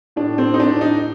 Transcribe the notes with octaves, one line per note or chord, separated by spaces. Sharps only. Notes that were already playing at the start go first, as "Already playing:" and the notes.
A2 D4
C4
D#4
A2 D4
D#4